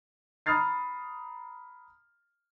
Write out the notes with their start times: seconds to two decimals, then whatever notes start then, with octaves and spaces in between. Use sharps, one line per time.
0.46 A#5 B5 D#6 F6 A6 C7